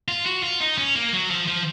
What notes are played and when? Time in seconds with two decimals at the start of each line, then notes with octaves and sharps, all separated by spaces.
0.08 F4
0.26 F#4
0.43 F4
0.60 D#4
0.78 C#4
0.95 A#3
1.13 F#3
1.30 F3
1.48 F3